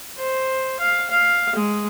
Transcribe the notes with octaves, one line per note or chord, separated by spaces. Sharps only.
C5
F5
F5
G#3